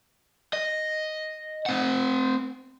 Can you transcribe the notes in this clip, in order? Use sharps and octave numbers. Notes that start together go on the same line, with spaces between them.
D#5
C4 F#5